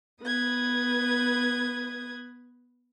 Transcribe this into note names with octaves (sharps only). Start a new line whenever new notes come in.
B3 B4 D#6 G#6